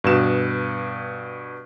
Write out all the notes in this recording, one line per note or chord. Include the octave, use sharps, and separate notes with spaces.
G2 B2 E7